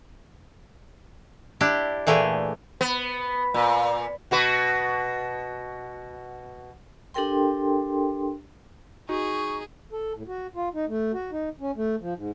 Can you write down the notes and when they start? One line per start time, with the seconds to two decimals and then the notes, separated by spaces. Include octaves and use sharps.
1.61 D4 E4 G4
2.07 A#2 E3 A3 G4 G#4
2.81 B3
3.54 A#2
4.31 B2 F#4 B4
7.14 D4 G4 A4 A#4 G5 C6
9.09 D#4 F#4 G#4 C#6
9.92 A4
10.15 A2
10.28 F#4
10.55 F4
10.75 D#4
10.88 A3
11.14 F#4
11.32 D#4
11.60 C#4
11.76 A3
12.01 F3
12.17 G#2